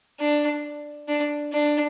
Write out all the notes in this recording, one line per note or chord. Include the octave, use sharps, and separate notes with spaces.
D4
D4
D4